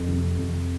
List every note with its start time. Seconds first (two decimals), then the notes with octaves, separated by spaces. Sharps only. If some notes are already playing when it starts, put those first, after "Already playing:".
Already playing: F2
0.09 C3
0.39 F2